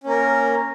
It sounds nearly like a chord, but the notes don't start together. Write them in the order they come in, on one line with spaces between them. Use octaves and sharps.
C#4 A#3 A#4